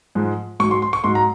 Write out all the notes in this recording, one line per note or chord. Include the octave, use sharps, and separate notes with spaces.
G#2 F3 G#3
G#2 F#3 C#6
C6
C6
C#6
G#2 F#3 C6
A#5